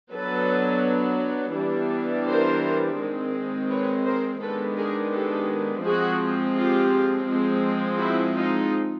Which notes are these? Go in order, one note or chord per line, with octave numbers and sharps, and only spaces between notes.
F#3 B3 D4 A4 B4
E3 G3 B3 D4
A#4 C5
D#3 G#3 C4
B4 C#5
A#4 C5
D#3 G#3 B3 D4 A4 B4
G#4 A#4
G4 A4
F3 G#3 C4 F#4 G#4
F4 G4
F3 G#3 C4
E4 F#4
D#4 F4